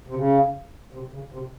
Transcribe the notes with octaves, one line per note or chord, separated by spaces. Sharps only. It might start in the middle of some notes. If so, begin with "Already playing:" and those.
C3
C#3
C3
C#3
C3